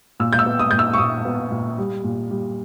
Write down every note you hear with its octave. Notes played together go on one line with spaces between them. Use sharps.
A#2 E6
G6
E6
B3
D#6
A#2 G6
E6
C#6
A#2 D#6
B3
A#2
G3
A#2
G3